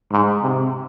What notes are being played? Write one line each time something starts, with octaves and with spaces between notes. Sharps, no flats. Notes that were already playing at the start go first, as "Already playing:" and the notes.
G#2
C3